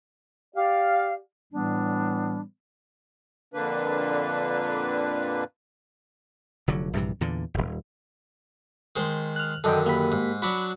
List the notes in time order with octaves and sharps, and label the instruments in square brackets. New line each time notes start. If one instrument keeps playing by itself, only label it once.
[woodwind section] G4 D5 F5
A2 E3 G3 B3 D4
[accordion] F2 A#2 D3 A#3 D4 B4
[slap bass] F1 D3 F#3
A#1 G2 C3 E3
E2 A#2 D3
D#1 G#1
[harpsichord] D#3 G#3 C5
[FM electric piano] F6 F#6
[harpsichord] F#2 D3 D#3 [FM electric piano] A4 D#5 G5
[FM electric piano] A#3 G4 B5
[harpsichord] G#2
[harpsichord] F#3 D4 F#4 [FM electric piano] B5